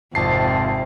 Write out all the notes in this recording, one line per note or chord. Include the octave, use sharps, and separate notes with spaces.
G#1 F2 C3 A5 C7